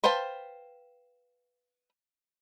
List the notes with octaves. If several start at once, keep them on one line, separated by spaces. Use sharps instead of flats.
B4 C5 F5 G5 A5